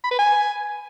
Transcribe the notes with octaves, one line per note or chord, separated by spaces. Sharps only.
B5
B4
G#5